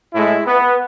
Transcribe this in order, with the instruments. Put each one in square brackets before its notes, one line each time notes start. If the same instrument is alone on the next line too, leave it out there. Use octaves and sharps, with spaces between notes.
[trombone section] A2 G#3 E4
B3